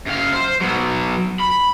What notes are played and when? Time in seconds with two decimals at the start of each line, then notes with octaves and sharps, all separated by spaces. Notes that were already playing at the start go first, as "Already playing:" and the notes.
0.06 F#2 F5
0.33 C5
0.61 F#3 B3
1.40 B5